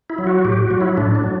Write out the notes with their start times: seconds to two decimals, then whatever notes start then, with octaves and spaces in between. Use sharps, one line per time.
0.10 E4
0.18 F#3
0.27 F#4
0.45 A2 G4
0.62 F#4
0.71 F#3
0.81 E4
0.97 A2 D4
1.15 D4
1.24 F#3